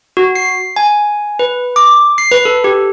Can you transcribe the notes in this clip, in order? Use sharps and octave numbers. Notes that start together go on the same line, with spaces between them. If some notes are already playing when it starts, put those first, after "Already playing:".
F#4
C7
G#5
B4
D6
C7
B4
A4
G4